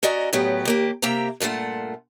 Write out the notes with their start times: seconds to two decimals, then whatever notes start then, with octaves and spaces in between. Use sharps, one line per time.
0.03 C#4 F#4 D5 D#5 A#5
0.33 A2 C#3 F#3 B3 G4
0.65 D#2 A#3 G4
1.02 C3 A#3 G4 E5 A#5
1.40 G2 A#2 A3 F4 F#5